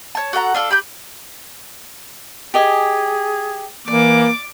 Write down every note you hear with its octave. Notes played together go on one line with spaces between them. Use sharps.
C#5 A5
F#4 A4 F#5 A#5
D4 F4 A4
G4 B5 G6
G4 G#4 D#5 G#5
E3 A#3 D5 D6